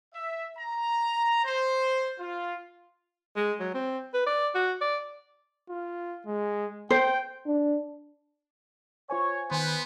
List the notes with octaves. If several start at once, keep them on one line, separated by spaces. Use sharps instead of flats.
E5
A#5
C5
F4
G#3
F#3
C4
B4
D5
F#4
D5
F4
G#3
C5 G5
D4
F4 C5 C#5 G#5
D#3 B3 B4 C5 G#5